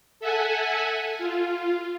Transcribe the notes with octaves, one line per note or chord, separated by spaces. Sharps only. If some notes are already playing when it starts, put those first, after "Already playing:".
A4 E5 F#5 G#5
F4